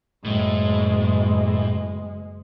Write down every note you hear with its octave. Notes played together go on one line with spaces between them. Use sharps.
F#1 A2 G#3